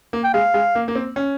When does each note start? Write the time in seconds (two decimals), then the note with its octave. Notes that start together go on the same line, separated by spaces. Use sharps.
0.13 A#3
0.24 G5
0.34 G#3 F5
0.54 G#3
0.75 A#3
0.88 A#3
0.95 C4
1.16 C#4